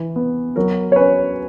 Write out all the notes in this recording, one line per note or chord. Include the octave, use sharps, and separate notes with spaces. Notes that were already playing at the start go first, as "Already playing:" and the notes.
Already playing: E3
B3
F#3 A#4
C#5
C#4 B4